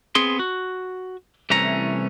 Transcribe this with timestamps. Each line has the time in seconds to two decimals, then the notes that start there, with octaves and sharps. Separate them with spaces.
0.15 B3 C4 G#4 C6
0.39 F#4
1.50 C2 C3 E3 A3 C#4 A#5